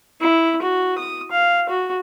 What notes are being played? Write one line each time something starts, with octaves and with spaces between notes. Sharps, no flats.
E4
F#4
D#6
F5
F#4